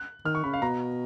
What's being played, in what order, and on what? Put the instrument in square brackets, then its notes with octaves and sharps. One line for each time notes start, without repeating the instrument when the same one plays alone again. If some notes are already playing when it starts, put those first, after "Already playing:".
Already playing: [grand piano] F#6
[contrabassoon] D#3 [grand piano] F6
[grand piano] C#6
[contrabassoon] C#3 [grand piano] B5
[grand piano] F5
[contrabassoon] B2 [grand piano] A#5